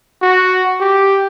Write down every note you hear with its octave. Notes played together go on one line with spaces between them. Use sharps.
F#4
G4